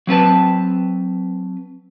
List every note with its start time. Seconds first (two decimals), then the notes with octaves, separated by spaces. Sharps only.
0.07 F#3 C4 B4 A5